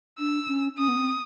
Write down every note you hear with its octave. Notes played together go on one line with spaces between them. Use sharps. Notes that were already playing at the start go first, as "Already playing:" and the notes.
D4 E6
C#4
C#4 D#6
B3
C4